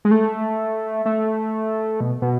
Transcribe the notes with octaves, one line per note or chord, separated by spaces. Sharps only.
G#3
A3
A3
B2
B2